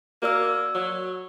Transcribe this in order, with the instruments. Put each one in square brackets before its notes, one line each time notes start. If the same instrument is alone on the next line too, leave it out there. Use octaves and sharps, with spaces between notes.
[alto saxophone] A#3 [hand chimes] F#4 D5 E6
[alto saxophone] F#3